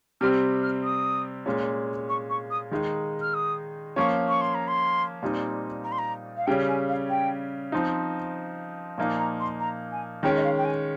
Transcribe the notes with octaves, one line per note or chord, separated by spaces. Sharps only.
C3 G3 C4 F6
F6
D#6
A#2 G#3 C#4
C#6
C#6
D#6
D#3 G#3 D#4
F6
D#6
F3 A#3 C#4 C#6
C#6
C6
A#5
C6
A#2 G3 C4 D#4
A#5
C6
A#5
F5
C#3 G3 C#4 G5
G#5
F5
G5
F3 C4 D#4
A#2 F3 A#3 D#4
A#5
C6
A#5
G#5
D#3 G#3 C#4 G5
D#5
F5
G5
G#5